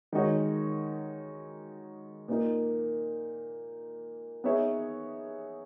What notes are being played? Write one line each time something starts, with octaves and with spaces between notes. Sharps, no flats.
D#3 G#3 D#4 F#4 C#5
A#2 A#3 D#4
B3 D#4 G#4 C#5 E5